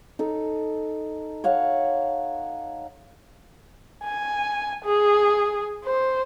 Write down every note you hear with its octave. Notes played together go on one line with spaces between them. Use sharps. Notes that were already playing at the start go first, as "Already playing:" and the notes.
D#4 A4
C#5 F5 F#5
G#5
G#4
C5